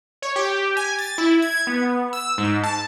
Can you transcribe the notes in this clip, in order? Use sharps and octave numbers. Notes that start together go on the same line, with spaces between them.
C#5
G4
G#5
A6
E4
G#6
B3
E6
G#2
A5